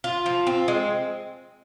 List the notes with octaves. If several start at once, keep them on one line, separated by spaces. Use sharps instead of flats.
F4
F3
C4
G#3